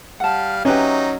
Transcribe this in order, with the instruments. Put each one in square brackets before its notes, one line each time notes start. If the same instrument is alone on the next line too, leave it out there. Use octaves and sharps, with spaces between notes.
[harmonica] G3 F5 [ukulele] F#5 A5
[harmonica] F#3 D#4 [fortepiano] C#4 [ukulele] G4 B4 E5